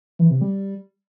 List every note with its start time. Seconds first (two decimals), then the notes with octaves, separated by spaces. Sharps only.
0.19 E3
0.30 C3
0.41 G3